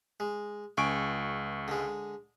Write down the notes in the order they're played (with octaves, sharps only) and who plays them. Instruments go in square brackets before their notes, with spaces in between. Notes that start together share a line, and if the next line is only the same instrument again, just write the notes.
[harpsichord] G#3
[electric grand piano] C#2 C#6 D7 [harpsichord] G#5
[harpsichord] D3 G#3